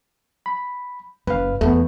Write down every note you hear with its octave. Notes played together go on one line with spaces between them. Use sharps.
B5
F#1 B4 F5
E2 A3 B3